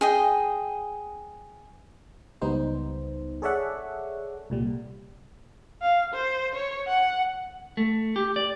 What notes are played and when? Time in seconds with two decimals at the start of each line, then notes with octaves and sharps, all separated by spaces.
0.01 G#4 D#5 G5
2.41 C#2 G3 B3 D#4 C5
3.42 G#4 A4 C#5 D5 E5 F#5
4.50 C2 A#2 G3
5.82 F5
6.14 C5
6.55 C#5
6.87 F#5
7.77 A3
8.16 G4
8.36 D5